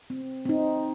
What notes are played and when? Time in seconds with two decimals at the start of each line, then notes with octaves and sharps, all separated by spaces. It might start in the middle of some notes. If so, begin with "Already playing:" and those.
0.10 C4
0.45 C4
0.49 D#4